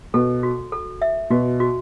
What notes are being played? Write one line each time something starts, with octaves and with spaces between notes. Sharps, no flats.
B2 A4
F#4
A4
E5
B2 F#4
F#4